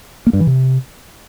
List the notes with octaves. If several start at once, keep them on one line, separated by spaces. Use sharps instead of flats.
A#3
G2
E3
C3